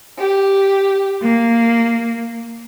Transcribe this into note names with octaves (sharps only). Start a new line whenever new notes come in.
G4
A#3